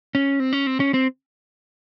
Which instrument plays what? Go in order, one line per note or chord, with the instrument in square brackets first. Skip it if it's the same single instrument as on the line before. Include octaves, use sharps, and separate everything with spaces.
[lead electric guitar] C#4
C4
C#4
C4
C#4
C4